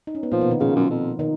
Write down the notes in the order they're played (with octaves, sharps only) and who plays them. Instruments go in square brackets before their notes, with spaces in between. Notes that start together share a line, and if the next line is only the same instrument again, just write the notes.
[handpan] D#4
C#4
B3
[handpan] A#2 A#3 [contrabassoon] F3
[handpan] B2 B3
D#3 D#4
[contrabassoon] C#3 [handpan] F3 F4
[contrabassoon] F#2
F2
[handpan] D#3 D#4